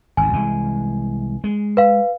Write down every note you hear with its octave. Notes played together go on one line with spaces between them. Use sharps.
G#1 D2 G#5
C2 E3 G#3
G#3
B4 F5